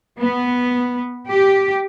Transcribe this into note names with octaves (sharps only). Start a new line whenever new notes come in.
B3
G4